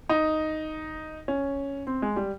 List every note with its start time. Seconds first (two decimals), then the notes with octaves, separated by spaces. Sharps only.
0.09 D#4
1.28 C#4
1.87 C4
2.02 G#3
2.16 G3